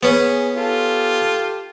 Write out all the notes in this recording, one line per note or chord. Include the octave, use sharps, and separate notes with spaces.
B3 C#4 G#4
F4 G4 A4